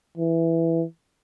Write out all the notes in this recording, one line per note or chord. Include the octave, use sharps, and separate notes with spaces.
E3